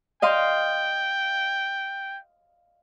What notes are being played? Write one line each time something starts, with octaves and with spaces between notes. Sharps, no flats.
D#5 F5 G5 C6